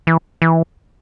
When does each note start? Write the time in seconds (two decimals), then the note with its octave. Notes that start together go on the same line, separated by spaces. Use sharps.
0.07 E3
0.42 E3